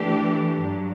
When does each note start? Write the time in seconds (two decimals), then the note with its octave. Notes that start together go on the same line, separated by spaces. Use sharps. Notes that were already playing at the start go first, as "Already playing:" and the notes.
Already playing: E3 A3 D4 G4
0.63 G2 F#3